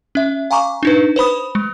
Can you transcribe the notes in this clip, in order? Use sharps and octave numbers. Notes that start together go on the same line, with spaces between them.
C#4 E5
F5 G#5 A#5 C#6 D6
D4 D#4 B4
B4 C5 B5 D#6
G#3